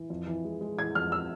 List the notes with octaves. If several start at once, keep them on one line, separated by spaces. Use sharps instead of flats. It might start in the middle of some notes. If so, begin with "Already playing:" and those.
Already playing: E3
F2
E3
G#3
G#3
E3 G#6
F2 F6
E6